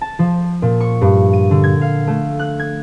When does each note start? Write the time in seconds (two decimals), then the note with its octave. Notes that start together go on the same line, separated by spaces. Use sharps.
0.01 A5
0.19 F3
0.62 A#2
0.80 C#6
1.01 G2
1.33 D#7
1.51 D3
1.64 G#6
1.81 F5
2.07 A3
2.39 F#6
2.60 G#6